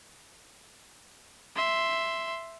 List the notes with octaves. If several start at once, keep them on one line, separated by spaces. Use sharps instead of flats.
E5 C6